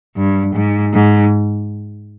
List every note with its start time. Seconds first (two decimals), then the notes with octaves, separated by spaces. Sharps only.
0.17 G2
0.55 G#2
0.93 G#2